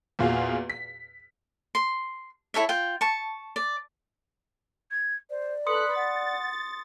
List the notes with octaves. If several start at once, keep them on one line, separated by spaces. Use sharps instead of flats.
E2 A#2 F4 F#4 G#4 F5
B6
C6
E4 A4 C#5 E5
F4 G5
A5 C#6
D5
G#6
C5 D5
A4 B4 B5 C6 D#6 F#6 C#7
F#5 A6